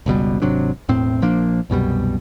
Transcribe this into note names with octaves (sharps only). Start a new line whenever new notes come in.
F#1 C#2 B2 G3
G#1 C3 F#3 D4
E1 A2 C4
A#1 F3 A#3 D4
C2 F#2 B2 G3